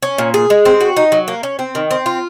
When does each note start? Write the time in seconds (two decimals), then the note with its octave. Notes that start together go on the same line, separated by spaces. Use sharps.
0.03 C#4
0.18 A#2
0.34 G#4
0.50 G#3
0.65 C4
0.81 F#4
0.97 D#4
1.12 F#3
1.28 A#3
1.43 C#4
1.59 C4
1.75 D#3
1.91 C4
2.06 F4